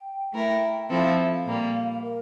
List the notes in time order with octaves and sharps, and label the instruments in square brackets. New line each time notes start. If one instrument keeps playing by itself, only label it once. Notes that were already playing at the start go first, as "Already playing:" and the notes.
Already playing: [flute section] G5
[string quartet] A3 E4 A#4
[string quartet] F3 C4 E4 A4 [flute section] G5
[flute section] F5
E5
F5
[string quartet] A#2 G3 A#3
[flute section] A#4